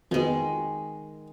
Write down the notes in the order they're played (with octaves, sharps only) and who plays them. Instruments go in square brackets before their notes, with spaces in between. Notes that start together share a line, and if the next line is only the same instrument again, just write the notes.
[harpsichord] F2 B2 [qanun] D#3 G#3